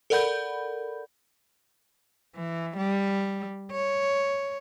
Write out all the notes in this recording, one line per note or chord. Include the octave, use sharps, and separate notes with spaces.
A4 A#4 D5 F#5 B5 G6
E3
G3
C#5